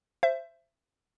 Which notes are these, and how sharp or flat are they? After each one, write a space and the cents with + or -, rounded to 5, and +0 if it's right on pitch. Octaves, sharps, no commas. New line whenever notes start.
C5 +0 E5 +25